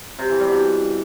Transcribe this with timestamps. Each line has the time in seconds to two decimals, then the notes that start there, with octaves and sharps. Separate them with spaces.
0.19 C3
0.29 E3
0.40 G3
0.50 B2